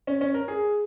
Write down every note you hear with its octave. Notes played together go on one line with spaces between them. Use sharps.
C#4
C#4
A#4
G#4